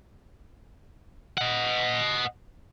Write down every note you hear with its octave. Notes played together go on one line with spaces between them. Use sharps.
D#5 F#5